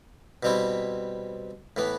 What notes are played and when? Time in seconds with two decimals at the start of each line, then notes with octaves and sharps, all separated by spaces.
0.43 B2 G3 C4 E4
1.76 A2 E3 B3